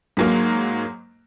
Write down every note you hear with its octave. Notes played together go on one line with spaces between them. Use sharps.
G#2 F#3 A#3